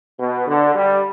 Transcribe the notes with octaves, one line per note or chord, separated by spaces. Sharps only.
B2
D3
G3